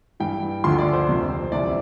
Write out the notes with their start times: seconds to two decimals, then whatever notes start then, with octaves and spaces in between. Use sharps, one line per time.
0.20 G2 E3 G5
0.64 D2 D3 F3 C6
0.79 D5
0.93 C5
1.08 F2 C3 F3 C5
1.30 C5
1.52 C2 C3 E3 D5